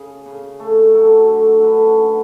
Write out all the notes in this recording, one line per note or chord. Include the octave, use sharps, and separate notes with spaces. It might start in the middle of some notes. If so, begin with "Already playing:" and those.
Already playing: C#3 G#4
C#3
A3
F#3 A4
D3
D3 B4
C#4
F#3